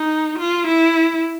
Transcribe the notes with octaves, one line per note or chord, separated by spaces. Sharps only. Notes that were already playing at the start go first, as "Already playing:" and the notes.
Already playing: D#4
F4
E4